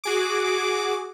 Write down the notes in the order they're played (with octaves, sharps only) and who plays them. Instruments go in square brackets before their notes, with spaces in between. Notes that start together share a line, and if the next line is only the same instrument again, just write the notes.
[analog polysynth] F#4 G#4 D6